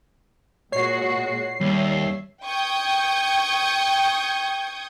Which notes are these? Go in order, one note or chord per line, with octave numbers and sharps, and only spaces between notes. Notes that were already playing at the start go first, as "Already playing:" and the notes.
A#2 G#3 F#4 C#5 C7
D#2 G3 E5
G5 C#6 D#6 G6 G#6